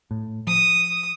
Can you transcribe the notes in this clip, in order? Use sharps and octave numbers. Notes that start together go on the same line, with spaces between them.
A2
F3 D#6